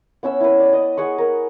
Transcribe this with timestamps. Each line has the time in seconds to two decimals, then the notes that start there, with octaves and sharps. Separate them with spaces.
0.23 B3 C#4 E5 E6
0.40 E4 B4
0.60 D5
0.73 D#5
0.97 G#4 F#5 C#6
1.18 A#4